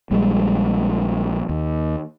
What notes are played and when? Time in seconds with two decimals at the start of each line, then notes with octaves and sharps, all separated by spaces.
0.11 A#1 G3 G#3
1.49 D#2